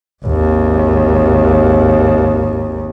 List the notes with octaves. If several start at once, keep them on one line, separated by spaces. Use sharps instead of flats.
G#1 D#2